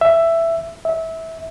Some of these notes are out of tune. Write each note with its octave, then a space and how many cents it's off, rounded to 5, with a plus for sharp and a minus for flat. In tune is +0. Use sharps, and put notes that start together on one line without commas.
E5 +10
E5 -20